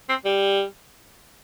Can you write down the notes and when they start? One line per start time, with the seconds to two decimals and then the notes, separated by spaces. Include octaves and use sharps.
0.09 C4
0.25 G3